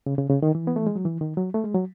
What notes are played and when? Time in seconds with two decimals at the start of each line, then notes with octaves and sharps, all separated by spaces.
0.06 C#3
0.18 C#3
0.30 C#3
0.43 D#3
0.55 E3
0.67 B3
0.76 A3
0.87 G#3
0.96 F#3
1.05 E3
1.21 D#3
1.37 F#3
1.54 A3
1.64 G#3
1.74 F#3